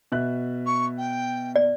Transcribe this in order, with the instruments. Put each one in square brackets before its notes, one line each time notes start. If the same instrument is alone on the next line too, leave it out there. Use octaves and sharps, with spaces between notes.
[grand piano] B2 E5 F#6
[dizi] C#6
G5
[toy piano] D5